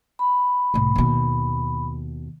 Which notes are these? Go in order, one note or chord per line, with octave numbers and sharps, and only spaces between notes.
B5
C2 A2
D#2 B2